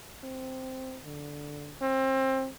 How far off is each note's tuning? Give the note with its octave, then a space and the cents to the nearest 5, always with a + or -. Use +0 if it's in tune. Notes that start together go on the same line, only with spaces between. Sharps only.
C4 -5
D3 -5
C4 +25